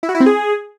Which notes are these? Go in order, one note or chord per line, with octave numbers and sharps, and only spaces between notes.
E4
F#4
E4
C4
G#4